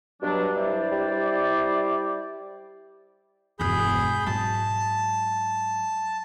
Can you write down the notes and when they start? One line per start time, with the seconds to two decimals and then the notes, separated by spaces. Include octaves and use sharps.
0.22 G2 B2 F#3 D4
0.57 E4 C5 D5
0.91 G3
1.11 G3
3.59 E1 G2 G#4 B5 G6
4.26 G#2 F#3 A5